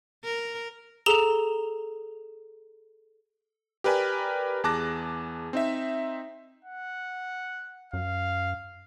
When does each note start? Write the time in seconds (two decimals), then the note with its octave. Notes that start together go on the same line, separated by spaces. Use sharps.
0.24 A#4
1.06 G#4 A4 A#5 E7 F7 G7
3.84 G4 A#4 B4 D5 G#5
4.64 E2 G#4 A5 D6 F#6 A#6
5.53 C4 D#4 E5
6.65 F#5
7.93 F#2 F5